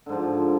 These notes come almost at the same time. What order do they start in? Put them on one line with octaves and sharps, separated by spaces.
D3 G#2 F3